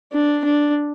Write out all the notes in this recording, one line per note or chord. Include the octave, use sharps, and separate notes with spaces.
D4
D4